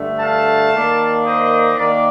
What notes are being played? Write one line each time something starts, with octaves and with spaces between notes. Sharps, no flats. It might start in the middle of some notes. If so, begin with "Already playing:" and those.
Already playing: G2 D3 A3
F5 A5
D#3 A#3 D4
C5 D#5
D#3 A#3 D4 A#4 D5